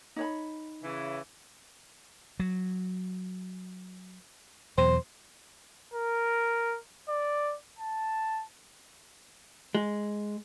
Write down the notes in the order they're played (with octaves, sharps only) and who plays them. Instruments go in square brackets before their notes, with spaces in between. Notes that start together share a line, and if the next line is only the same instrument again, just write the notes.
[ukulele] D#4 C#5 B5
[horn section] C#3 E3
[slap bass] F#3
[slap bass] E2 B2 F#3 [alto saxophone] C5
[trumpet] A#4
D5
A5
[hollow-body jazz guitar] G#3